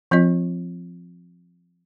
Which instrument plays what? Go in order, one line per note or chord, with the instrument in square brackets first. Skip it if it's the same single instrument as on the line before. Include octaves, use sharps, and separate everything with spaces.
[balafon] F3 C4 F4 D#5